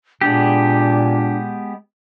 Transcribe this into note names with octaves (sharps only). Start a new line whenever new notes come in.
A#2 G#3 B3 D4 G4